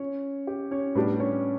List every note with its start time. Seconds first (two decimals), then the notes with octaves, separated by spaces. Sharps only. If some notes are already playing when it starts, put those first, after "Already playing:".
Already playing: C#4 C#5
0.47 G4
0.71 C#4 C#5
0.95 A2 G3 B3 D4 G4 B4
1.20 C#4 C#5